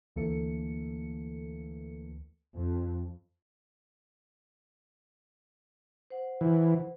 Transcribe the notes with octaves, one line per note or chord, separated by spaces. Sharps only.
D2 E3 A#3 A4 C#7
F2
C5 F#5
E3